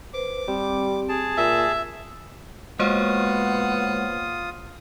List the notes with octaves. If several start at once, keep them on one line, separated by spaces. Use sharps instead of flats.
B4 C5 D6
G3 C4 G4
G#4 A5
A#2 E5
G#3 A#3 B3 F4 F#4 C5 C#5 D#6